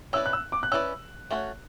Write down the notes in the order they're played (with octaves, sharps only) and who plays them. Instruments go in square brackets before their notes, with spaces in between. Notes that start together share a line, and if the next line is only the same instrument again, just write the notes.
[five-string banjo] C#4 E4 B4 D5 [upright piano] E6
[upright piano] F#6
E6
D6
F#6
[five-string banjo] C#4 E4 B4 D5 [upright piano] E6
[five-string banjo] A3 C#4 F#4 C#5